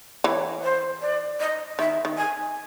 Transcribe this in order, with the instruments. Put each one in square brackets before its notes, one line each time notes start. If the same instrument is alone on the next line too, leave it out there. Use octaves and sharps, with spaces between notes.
[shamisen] E3 [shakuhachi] C#5
[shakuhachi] C5
D5
D#5
[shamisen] D#3 [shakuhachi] E5
[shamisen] D#3
[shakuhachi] G#5